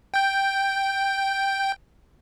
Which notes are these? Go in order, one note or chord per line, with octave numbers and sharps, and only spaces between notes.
G5 G6